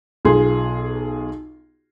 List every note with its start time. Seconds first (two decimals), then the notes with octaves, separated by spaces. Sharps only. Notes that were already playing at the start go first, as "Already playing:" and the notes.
0.25 B1 F4 G#4 C6